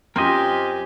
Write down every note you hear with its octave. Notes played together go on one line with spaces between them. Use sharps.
F#2 C4 F4 G4 A#4 C5 D#5 G#5